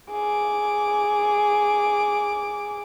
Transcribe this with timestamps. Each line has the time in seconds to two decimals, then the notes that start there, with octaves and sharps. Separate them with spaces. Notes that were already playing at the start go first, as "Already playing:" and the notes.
0.11 G#4 D6